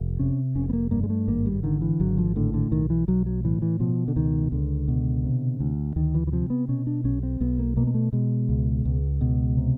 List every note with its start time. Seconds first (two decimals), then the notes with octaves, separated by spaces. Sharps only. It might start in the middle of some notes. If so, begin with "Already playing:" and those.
Already playing: F1
0.20 C3 C#4
0.55 F1 C#4
0.70 B3
0.73 A#3
0.91 G2 A#3
1.03 G#3
1.10 A3
1.28 G#1 A#3
1.46 G3
1.63 D3 D#3
1.81 E3
2.00 G#1 F#3
2.18 F3
2.36 A2 D3
2.54 D3
2.71 B1 D#3
2.90 E3
3.08 B1 F#3
3.26 F#3
3.44 A2 E3
3.62 E3
3.80 B2 F3
4.08 D3
4.16 C#2 D#3
4.52 C#2 D3
4.88 B2
5.24 C3
5.60 D2
5.96 D2 D#3
6.14 E3
6.27 E3
6.32 C3 F3
6.50 B3
6.68 B2 C#4
6.87 D4
7.04 B1 C#4
7.23 C4
7.40 B1 B3
7.59 A#3
7.77 B2 A#3
7.87 A#3
7.94 A3
8.13 B2 G#3
8.49 C#2
8.85 C#2
9.21 B2
9.57 C3